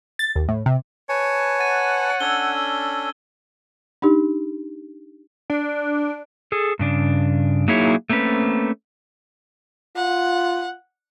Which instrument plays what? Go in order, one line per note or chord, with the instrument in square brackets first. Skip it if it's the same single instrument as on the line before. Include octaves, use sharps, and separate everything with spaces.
[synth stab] A6
D#2
A2
C3
[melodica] B4 G#5 A5 [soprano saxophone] C#5
[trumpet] F#5 [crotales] A6 D#7
[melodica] C#4 D4 A4 [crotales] E6 G#6 G7
[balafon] D4 D#4 G4
[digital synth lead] D4
[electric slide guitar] G#4 A4
G2 C#3 D4
F#3 A#3 D#4 E4 G#4 C#5
A3 A#3 C4 C#4 B4
[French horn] F4 [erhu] F#5